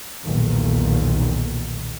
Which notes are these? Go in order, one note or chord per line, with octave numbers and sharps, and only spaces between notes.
B1 E2 A#2 D#3